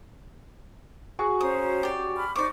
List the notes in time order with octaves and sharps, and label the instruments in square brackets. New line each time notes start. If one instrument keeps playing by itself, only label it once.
[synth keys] F#4 [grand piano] G#4 C#6
[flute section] C#4 C5 A#5 [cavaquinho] D#6
[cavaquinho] G4 D5
[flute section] B5 F6
[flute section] D#4 C5 C#6 [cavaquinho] D5 D6